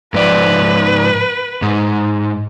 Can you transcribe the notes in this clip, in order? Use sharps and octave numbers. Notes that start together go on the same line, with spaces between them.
G#2 F3 B4 D5
G#2